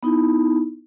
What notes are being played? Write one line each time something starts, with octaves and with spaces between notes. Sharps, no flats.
B3 D#4 E4